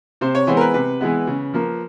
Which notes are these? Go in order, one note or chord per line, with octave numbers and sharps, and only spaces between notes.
C3 C5
C#5
E3 G#3 B3 C5
A#4
B4
C3 B4
E3 G#3 B3
C#3
F3 A#3